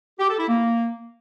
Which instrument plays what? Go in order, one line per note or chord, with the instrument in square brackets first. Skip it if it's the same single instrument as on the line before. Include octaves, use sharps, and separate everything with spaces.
[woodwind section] G4
A4
E4
A#3